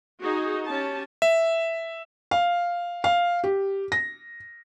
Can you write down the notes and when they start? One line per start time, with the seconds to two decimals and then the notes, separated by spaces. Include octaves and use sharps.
0.22 D#4 F#4 G#4
0.66 C#4 G4 A5
1.22 E5
2.31 F5
3.04 F5
3.44 G4
3.92 A#6